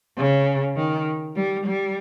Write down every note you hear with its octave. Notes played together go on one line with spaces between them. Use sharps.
C#3
D#3
G3
G3